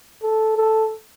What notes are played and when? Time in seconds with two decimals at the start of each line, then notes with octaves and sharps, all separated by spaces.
0.23 A4
0.57 A4